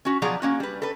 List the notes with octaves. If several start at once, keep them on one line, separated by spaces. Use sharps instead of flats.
C#4 F#4
B2 F3 F#3 G#4 D5 A#5
A#3 C#4 F#4
G3 B4
A4 B4